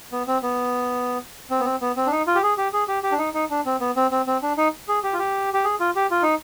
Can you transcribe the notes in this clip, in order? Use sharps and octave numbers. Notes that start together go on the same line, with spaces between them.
B3
C4
B3
C4
B3
C4
B3
C4
D4
D#4
F4
G4
G#4
G4
G#4
G4
G4
D4
D#4
D#4
D4
C4
B3
C4
C4
C4
D4
D#4
G#4
G4
F4
G4
G4
G#4
F4
G4
F4
D#4